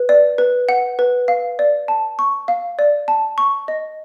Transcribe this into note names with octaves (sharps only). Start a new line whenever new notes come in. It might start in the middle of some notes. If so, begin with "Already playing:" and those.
Already playing: B4
D5
B4
F#5
B4
F5
D5
A5
C#6
F5
D5
A5
C#6
D#5